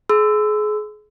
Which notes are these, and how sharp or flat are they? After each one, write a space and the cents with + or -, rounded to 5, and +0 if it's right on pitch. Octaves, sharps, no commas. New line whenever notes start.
G#4 +30 C6 -40 E6 +0